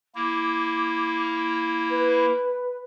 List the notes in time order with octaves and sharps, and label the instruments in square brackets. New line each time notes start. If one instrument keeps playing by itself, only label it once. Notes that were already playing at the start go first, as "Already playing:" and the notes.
[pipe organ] A#3 E4 [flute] D6
[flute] B4